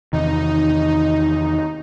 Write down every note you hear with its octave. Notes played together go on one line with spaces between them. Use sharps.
E2 C3 D#3 D#4